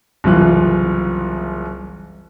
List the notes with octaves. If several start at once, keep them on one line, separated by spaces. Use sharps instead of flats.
F#1 C2 E3 F4 F#6